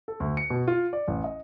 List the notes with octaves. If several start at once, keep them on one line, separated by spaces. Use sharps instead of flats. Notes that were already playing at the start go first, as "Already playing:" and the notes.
A4
D2
C#7
B2
F4
D5
A1
D#5